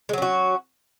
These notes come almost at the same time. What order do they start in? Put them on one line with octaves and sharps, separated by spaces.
G#3 F#3 C#4 F#4